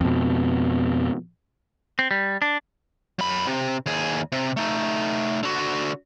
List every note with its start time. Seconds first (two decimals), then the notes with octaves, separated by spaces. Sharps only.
0.01 F2 B2
1.99 C4
2.11 G3
2.42 D4
3.19 F#2 B5
3.47 C3
3.86 D#2 G#4
4.32 C3
4.57 A3 D#4
5.43 D3 F#4